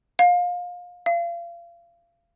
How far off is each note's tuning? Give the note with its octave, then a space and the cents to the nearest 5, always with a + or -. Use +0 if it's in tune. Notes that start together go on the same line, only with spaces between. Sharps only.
F5 +25
F5 -30